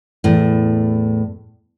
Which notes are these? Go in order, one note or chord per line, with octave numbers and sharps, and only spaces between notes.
E2 A2